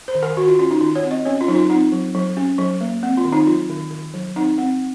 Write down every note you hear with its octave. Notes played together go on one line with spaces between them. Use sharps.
C5
D#3
A#4
D#3 F#4
F4
C#4 F4
D#4
D#3 F4
C#5
C4
D#5
C#4 C#5
F4
F#3 D#4
F4
C4 D#4
F#3
F#3
C#4
F#3
A#3
C4
F4
D#3
D#4
F#3 F4
D#3
D#3
F#3
C4 D#4
C4